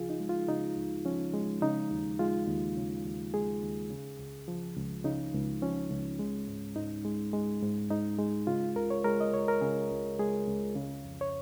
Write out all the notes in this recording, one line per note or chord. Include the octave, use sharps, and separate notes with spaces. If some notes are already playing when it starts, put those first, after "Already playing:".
Already playing: C#2 C#3 F3 F4 G#4
D#4
G#3
F4
C#3 D#4
C#2
F3 C#4
G#3
C#3 D#4
D#2
G#3 F4
D#2
C#3
D#2
G#3 G#4
D#2
C#3
C#2
F3
C#2
C#3 D#4
C#2
F3 C#4
C#2
G#3
G#2
G#2 D#4
G#3
G#3
G#2
G#2 D#4
G#3
C#3 F4
C#2 A#4
C#5
G#3 A#4
D#5
C#2 C#5
A#4
C#3 G#4
C#2
G#3 G#4
C#2
C#3
F2
C#5